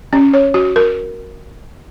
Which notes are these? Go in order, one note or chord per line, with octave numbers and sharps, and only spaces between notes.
C#4
C#5
F#4
A#4